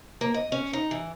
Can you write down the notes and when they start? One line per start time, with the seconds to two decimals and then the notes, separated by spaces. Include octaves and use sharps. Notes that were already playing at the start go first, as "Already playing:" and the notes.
0.21 A#3
0.34 D#5
0.52 C#4
0.73 D#4
0.91 E3